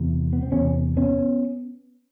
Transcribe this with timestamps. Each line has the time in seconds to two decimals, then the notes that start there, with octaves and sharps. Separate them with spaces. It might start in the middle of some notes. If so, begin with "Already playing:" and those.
Already playing: E2 C3
0.33 B3
0.43 C4
0.52 E2 C3 B3 C#4
0.97 B3 C#4